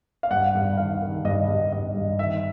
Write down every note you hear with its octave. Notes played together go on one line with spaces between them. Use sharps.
F5
G2 F#5
G2
D#3 F5
D#3
G2 D#5
G2
G2 D#5
G2
D#3 E5